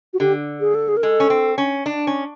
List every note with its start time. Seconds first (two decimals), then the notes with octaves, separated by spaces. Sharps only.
0.14 F#4
0.20 D3 G4
0.60 G#4
0.75 A4
0.88 G#4
0.97 A#4
1.03 G#3 A4
1.20 C#4
1.30 C4
1.58 C#4
1.86 D4
2.07 C#4